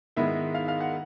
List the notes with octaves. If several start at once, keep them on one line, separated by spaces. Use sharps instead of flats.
G#2 D#3 G#3 B3 E4 E5
F5
F5
F#5